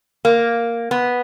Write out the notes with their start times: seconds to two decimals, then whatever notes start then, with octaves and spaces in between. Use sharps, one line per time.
0.25 A#3
0.91 B3